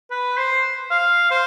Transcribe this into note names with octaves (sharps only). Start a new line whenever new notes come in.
B4
C5
F5
C5